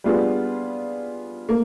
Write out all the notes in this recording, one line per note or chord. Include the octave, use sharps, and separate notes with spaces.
G3 B3 D4 F4 G#4
A#3